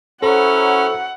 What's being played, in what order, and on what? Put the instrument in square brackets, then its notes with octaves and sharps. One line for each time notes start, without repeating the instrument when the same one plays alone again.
[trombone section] F#3 E4 [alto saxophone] C#4 [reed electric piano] A4 C5 [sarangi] F#5